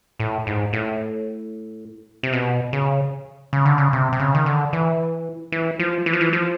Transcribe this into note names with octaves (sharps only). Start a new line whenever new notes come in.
A2
G#2
A2
C3
B2
C#3
C#3
D3
C#3
C3
C3
C#3
D#3
D3
E3
E3
F3
E3
F3
E3
F3